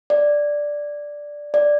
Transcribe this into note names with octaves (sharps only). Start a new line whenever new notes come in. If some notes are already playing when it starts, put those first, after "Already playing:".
D5
D5